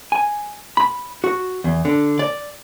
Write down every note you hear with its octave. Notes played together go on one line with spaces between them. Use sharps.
G#5
B5
F#4
E2
D3
D5